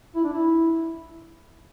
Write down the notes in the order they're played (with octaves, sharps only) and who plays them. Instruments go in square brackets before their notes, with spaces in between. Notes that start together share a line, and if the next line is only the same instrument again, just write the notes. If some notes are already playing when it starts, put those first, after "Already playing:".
[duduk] E4
D4
E4